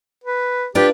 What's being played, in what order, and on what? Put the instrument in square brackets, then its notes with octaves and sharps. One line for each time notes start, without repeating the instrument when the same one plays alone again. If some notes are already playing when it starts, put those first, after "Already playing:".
[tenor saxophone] B4
[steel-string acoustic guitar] D4 F4 B4 [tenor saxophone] G4